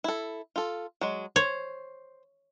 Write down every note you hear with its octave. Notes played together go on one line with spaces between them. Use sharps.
E4 A4
F4 A4
F#3 G#3
C5 C#5